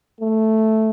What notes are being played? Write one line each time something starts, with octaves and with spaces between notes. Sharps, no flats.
A3